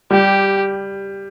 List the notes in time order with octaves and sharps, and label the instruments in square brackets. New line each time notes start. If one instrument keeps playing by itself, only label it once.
[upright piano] G3 [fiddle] G4